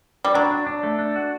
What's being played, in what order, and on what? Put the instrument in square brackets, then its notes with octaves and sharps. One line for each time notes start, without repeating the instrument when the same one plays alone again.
[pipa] G3
[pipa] F#3 [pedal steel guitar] D4
[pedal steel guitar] D4
D4
A3
D4
F#4